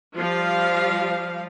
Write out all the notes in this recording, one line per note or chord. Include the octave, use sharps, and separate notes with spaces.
F3 G3 F5